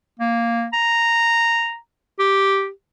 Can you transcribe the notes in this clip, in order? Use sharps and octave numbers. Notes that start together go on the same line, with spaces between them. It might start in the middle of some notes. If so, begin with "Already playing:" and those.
A#3
A#5
G4